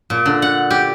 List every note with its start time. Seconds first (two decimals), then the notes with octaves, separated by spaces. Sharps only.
0.10 A#2
0.26 D3
0.42 F#5
0.71 G4